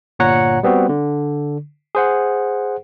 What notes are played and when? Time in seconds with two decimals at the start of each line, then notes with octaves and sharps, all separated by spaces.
0.19 G1 A#2 C#5 F#5 A#5 C#7
0.63 G3 B3 C4 F#4
0.89 D3
1.95 G#4 C5 F#5